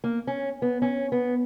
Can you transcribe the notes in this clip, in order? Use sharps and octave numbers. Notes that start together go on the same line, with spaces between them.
A#3
C#4
B3
C#4
B3